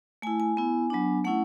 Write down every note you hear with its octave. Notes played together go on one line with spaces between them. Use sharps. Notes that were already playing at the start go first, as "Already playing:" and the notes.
A3 E4 G#5
G#5
B3 E4
F#3 B3 D4
A3 C#4 E4 F#5